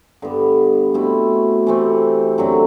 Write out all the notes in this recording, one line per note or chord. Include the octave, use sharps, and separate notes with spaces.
G2 D3 G3 B3
B2 A3 C4 E4
C3 E3 A3 C4
F#2 D3 F#3 C4